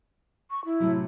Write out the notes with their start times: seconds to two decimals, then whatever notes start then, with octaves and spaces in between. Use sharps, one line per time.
0.51 C#6
0.65 E4
0.80 A2 C3 F#3